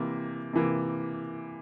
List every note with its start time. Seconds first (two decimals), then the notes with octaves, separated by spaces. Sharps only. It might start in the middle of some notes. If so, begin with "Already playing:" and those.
Already playing: C3 E3 A#3
0.53 C3 E3 A#3